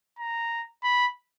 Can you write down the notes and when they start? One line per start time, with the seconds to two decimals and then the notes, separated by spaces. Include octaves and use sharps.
0.19 A#5
0.83 B5